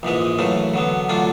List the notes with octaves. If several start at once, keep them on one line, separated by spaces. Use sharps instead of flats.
A#1 G#2 E3 G#3
F#2 C#3 E3 A3
D3 F#3 B3
D3 F#3 A3 D4 F4